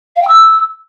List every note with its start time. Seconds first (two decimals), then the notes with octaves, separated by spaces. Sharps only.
0.16 F5
0.22 G5
0.27 E6